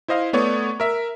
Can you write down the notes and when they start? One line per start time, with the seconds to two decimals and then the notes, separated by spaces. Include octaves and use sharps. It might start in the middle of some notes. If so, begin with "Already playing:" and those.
0.08 E4 C5 D#5 F5
0.33 A3 B3 C#5 D5 C#6 D#6
0.80 A#4 E5